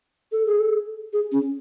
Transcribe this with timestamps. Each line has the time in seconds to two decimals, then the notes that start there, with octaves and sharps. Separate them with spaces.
0.32 A4
0.47 G#4
0.60 A4
1.13 G#4
1.32 C#4